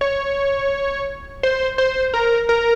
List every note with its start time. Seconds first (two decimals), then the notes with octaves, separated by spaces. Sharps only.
0.01 C#5
1.43 C5
1.78 C5
2.14 A#4
2.49 A#4